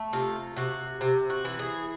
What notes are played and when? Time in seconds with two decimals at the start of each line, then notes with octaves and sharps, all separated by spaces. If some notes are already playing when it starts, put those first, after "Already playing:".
Already playing: A3
0.13 C3 F4
0.57 C3 F#4
1.01 C3
1.30 F#4
1.45 E3
1.59 G#4